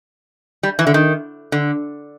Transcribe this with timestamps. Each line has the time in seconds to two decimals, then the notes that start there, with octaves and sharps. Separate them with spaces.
0.63 G3
0.79 E3
0.87 D3
0.94 D#3
1.52 D3